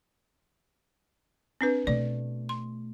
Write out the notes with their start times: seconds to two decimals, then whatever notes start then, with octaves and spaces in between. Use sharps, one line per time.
1.61 C4 D4 B4
1.87 B2 A3 D5
2.49 C6